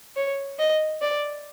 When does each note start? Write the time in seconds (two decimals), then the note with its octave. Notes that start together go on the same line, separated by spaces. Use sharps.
0.16 C#5
0.59 D#5
1.01 D5